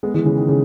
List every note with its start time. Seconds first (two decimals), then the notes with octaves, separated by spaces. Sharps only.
0.03 G#3 B3
0.14 E3 G#3
0.26 C#3 E3
0.37 D#3
0.49 C#3